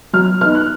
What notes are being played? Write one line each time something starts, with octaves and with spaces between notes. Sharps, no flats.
F#3 F6
B3 D#4 F6
F#6